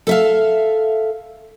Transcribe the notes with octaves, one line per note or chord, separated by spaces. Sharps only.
A4 E5 F5